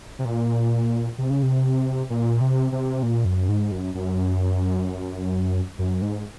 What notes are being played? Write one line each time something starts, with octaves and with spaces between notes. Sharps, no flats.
C3
A#2
C3
C#3
C3
A#2
C3
C3
A#2
F#2
G#2
F#2
F#2
F#2
G#2